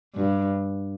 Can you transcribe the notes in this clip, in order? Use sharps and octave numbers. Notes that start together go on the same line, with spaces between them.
G2